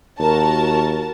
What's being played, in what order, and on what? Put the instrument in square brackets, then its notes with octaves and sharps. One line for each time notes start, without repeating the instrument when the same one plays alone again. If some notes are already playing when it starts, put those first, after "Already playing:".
[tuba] D#2 [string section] F#4 A#4 A5